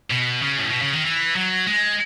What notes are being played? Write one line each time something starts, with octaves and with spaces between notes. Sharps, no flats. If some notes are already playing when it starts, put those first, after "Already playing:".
B2
C#3
A2
B2
C#3
D#3
E3
F#3
G#3